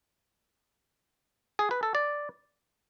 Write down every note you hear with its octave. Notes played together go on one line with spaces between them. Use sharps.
G#4
B4
A4
D5